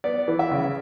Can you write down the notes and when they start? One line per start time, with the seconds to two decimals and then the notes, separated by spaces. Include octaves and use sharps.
0.04 B3 D5
0.28 E3
0.39 E5
0.52 C#3